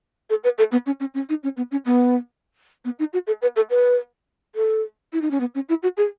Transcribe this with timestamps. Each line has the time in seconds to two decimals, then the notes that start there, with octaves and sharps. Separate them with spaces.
0.30 A4
0.44 B4
0.58 A4
0.72 B3
0.86 C#4
1.00 C#4
1.14 C#4
1.29 D#4
1.43 C#4
1.57 B3
1.71 C#4
1.86 B3
2.85 B3
2.99 D#4
3.13 F#4
3.27 A4
3.42 B4
3.56 A4
3.70 B4
4.55 A4
5.13 E4
5.22 D#4
5.31 C#4
5.40 B3
5.55 C#4
5.69 E4
5.83 F#4
5.97 G#4